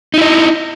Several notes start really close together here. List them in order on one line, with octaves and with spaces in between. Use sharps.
D#4 E4 D#5